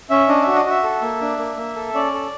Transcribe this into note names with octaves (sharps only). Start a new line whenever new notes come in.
C#4 E5
D4 D#5
F#4 E5
D#5
F#4 E5
A4
A#3
D4
A#3
A#3
A4
C#4 D5
A4